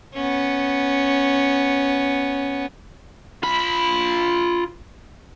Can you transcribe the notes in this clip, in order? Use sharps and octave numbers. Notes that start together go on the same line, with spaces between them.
B3 C#4
F4 B5